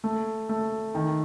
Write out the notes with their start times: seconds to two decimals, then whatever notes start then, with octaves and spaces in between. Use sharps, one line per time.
0.04 A3
0.49 A3
0.95 D#3